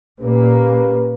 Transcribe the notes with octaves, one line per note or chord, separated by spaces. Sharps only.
A#2 A#3 C#4 G4 B4